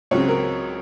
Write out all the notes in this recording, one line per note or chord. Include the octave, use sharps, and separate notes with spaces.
C#2 C#3 F#3 C4 C#5
A#4